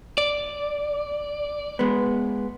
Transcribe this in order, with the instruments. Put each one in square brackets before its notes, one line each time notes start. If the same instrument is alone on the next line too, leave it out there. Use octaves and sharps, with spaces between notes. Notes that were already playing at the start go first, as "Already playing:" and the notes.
[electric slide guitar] D5
[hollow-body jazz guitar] G#3 B3